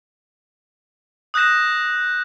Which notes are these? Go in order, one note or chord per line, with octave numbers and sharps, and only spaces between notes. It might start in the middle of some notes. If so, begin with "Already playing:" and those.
D#6 F#6 G6 A#6 E7